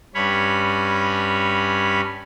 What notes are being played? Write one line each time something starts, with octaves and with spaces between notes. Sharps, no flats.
G2 C#4 C#5 B5